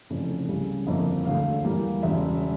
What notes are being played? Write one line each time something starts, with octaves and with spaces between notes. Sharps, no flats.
F1 F2 C#3 E3
C#2 C#3 G3
G1 F2 E3 A#3
E1 D2 D3 A3 F5
E2 E3 G3 A#3
E1 E2 C#3 E5